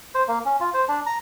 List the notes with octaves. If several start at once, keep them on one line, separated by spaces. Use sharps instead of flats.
C5
A#3
C#4
F4
C5
D4
A#5